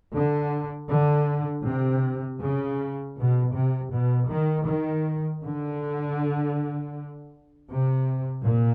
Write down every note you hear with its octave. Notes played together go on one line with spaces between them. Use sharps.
D3
D3
C3
C#3
B2
C3
B2
D#3
D#3
D3
C3
A#2